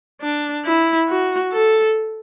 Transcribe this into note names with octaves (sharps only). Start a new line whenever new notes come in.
D4
E4
F#4
A4